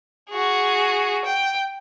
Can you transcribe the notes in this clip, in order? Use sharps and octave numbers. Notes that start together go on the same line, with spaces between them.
F#4 G#4
G5